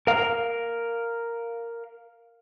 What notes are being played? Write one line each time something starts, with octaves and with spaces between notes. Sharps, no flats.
A#4 F5